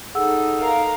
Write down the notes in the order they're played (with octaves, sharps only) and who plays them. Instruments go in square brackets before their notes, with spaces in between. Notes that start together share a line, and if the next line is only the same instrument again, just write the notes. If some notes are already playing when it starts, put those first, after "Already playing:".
[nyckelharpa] D#4 A4 [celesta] G#4 F#5 E6
[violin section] A#4 F5